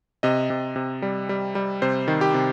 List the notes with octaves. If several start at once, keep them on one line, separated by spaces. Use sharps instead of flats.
C3 D#5
C3
C3
G3
G3
G3
C3 C5
D#3
G4
C3